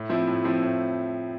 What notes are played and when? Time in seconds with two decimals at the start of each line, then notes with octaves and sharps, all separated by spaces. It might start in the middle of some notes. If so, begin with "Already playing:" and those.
Already playing: A2
0.09 F3 C4 E4
0.27 A2
0.44 F3 C4 E4
0.62 A2